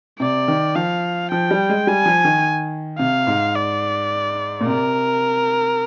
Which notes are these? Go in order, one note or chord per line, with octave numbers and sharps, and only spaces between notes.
C3 D5
D#3
F3 F5
F3 G5
G3
G#3
G3 G#5
F3
D#3
C3 F5
G#2
D5
A#2
C3 A#4